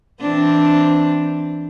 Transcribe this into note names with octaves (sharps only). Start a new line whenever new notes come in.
E3 C4 D4